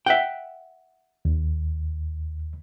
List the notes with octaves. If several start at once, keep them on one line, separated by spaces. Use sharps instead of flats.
E5 F#5 G5
D#2